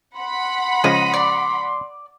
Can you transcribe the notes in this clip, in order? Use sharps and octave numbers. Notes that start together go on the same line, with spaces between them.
F#5 B5 C6
C#3 F3 G#3 D#5
D5